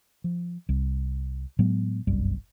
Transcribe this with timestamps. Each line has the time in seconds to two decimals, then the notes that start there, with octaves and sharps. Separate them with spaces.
0.24 F3
0.69 C2
1.59 A2 F#3 G#3 B3
2.07 G1 C2 F#2 G3